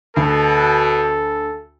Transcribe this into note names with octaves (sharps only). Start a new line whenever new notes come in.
D2 B2 A4